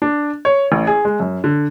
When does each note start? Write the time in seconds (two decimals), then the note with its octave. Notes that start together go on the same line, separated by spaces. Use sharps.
0.02 D4
0.45 C#5
0.72 A1
0.87 G#4
1.05 G#3
1.20 F#2
1.44 D3